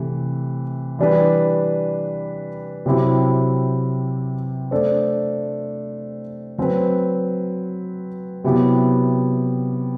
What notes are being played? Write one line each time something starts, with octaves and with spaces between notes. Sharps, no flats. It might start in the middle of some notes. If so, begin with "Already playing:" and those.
Already playing: C3 E3 A3
E3 G3 D4 G4 B4
C3 F#3 C4 E4 G4
A3 D4 A4 C5
F#3 C4 F#4 B4
C3 F#3 B3 E4 G4